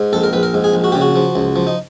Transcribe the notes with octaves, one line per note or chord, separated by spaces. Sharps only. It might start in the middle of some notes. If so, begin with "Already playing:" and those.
Already playing: G#2
A#1 A4
A#4
A#1 B4
A#4
G#2
G#4
A#1
F#4
C#3 G4
F#4
F3
C#2
F3
D#4